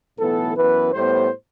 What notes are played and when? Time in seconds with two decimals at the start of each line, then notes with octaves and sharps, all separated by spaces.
0.18 B1 A2 E3 B3 A4
0.56 F#2 E3 B3 B4
0.92 A2 G3 B3 C5